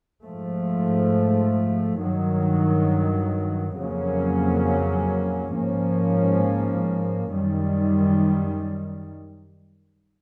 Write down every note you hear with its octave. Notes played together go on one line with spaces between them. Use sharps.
G#2 F3 A3
G2 D#3 F#3
F2 C#3 F#3 A#3 C#4
G#2 F3 A#3 C#4
F#2 D#3 G3